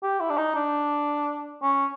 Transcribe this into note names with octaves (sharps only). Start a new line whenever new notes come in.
G4
E4
D4
D#4
D4
C#4